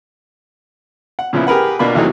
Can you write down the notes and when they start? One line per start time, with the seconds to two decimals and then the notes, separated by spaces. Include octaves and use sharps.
1.19 F#5
1.33 A#2 C#3 F3 B3 E4
1.47 G4 G#4 A#4 B4 F#5
1.79 B2 A#3 D4 F4 B5
1.95 E2 C3 E3 F#3 A3 D#4